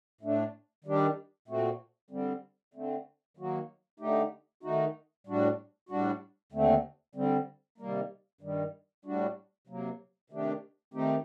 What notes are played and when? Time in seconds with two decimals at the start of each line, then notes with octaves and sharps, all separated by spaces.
0.21 A2 A3 D4
0.84 D#3 G3 D4 G4
1.48 A#2 A3 C4 F#4
2.11 D3 G3 C4
2.74 D3 A3 C4
3.37 D#3 F#3 A#3 F#4
4.00 D3 A3 D#4 G4
4.63 D#3 A3 D#4 F#4
5.27 A2 G3 D4 F#4
5.89 A2 G3 D4 F#4
6.52 D#2 D3 A3 C4
7.15 D3 G3 C4
7.78 C3 D#3 G3 A#3
8.41 G2 D#3 G3
9.05 A2 G3 D4 F#4
9.67 C3 F#3 A#3
10.30 C3 D#3 A3 D4 G4
10.94 D#3 A3 C4 D#4 G4